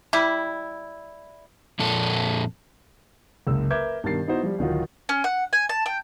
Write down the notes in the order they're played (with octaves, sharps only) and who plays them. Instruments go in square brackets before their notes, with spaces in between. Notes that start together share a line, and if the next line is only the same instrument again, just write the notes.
[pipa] G3 E4
[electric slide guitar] F2 A#2 A4
[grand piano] F#1 C#2 E6
A#4 B4 E5 D6 G6 G#6
G2 B2 D#3 A#4 A6 C7
B3 D#4 E4 F#4 C5
F3 G3
D1 D#3 D#4 F4 F#4
[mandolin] C#4
F#5
G#5
A5
G5